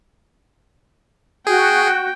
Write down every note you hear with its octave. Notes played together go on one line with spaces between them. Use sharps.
F#4 G#4 G5